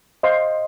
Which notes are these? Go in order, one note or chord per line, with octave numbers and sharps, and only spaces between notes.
C5 D#5 F5 C6